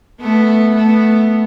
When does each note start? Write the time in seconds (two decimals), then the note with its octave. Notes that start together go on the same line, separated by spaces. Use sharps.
0.21 A3 B3
0.75 A3 B3